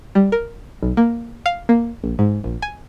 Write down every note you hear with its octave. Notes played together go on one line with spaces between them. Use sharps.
G3
A#4
B1
A#3
F5
A#3
A#1
G#2
A#1
G#5